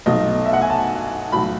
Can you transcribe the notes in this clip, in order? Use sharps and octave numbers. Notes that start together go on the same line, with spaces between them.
B1 B2 F#3 A3 D#5
E5
F#5
G#5
A5
B1 A2 F#3 B5